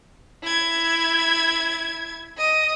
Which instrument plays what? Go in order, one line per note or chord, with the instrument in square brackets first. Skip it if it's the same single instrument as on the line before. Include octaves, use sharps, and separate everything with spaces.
[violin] E4 G#6
D#5 D#6